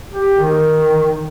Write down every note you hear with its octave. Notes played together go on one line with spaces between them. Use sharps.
G4
D#3